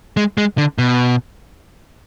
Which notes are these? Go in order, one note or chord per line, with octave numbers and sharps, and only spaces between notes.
G#3
G#3
D3
B2